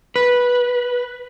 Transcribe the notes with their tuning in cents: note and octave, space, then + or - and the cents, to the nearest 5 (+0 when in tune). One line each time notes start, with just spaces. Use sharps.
B4 -15